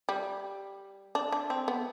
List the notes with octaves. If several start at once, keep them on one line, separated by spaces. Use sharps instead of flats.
G3
D4
D4
C4
B3